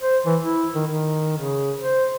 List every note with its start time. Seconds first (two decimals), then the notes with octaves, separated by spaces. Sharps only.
0.01 C5
0.26 E3
0.41 E4
0.75 D#3
0.87 D#3
1.38 C#3
1.79 C5